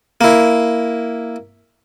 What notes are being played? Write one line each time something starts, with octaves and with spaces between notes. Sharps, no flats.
A#3 E4